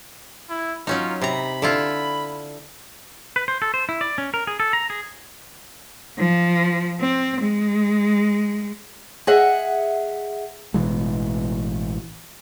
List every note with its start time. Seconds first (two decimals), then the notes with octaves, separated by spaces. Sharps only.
0.50 E4
0.87 F#3 C#4 D#4 F4
1.22 C3 A#5 B5
1.62 D3 E4 F4
3.36 B4
3.48 C5
3.62 A4
3.74 C5
3.89 E4
4.01 D5
4.18 C#4
4.34 A#4
4.47 G#4
4.60 A4
4.73 A#5
4.90 G#4
6.18 F3
7.00 C4
7.41 G#3
9.27 G#4 D#5 E5 F#5
10.74 A1 B2 E3 G#3